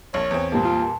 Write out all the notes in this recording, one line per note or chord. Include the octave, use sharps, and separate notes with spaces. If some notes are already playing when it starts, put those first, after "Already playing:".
A#1 C#5
E2 C4
A#2 G3 A#3 A5
F4